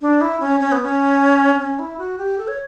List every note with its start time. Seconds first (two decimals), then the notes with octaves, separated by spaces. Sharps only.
0.01 D4
0.21 E4
0.40 C#4
0.60 C#4
0.72 B3
0.83 C#4
1.59 C#4
1.79 E4
1.98 F#4
2.18 G4
2.38 A4
2.48 C#5